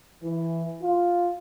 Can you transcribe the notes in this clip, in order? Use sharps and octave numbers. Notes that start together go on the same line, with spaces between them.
E3
F4